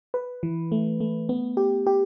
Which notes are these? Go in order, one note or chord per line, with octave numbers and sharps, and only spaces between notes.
B4
E3
A3
A3
B3
G4
G4